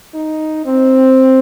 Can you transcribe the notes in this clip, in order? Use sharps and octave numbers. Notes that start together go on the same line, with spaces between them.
D#4
C4